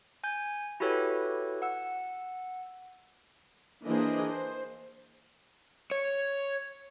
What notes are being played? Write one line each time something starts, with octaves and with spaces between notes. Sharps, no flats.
G#5 G6
E4 F#4 G4 A4 B4 C#5
F#5 E6
E3 A#3 D4 G#4 C5 D#5
C5
C#5